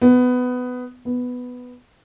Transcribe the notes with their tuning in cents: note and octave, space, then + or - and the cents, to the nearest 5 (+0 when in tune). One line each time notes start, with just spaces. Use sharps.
B3 +15
B3 +5